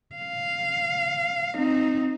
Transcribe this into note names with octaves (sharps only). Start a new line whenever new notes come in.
F5
C4 D#4